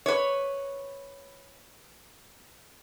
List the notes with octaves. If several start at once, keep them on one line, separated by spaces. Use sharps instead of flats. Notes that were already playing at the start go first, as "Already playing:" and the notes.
B4 C#5